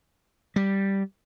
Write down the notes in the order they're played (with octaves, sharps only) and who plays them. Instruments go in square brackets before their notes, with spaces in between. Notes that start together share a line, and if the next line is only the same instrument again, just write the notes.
[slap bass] G3